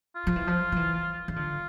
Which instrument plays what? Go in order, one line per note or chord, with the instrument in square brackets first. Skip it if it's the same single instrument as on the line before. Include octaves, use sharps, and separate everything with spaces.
[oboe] F4
[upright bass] F3
E3
F3
F3
E3
E3
[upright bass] D3 [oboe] F4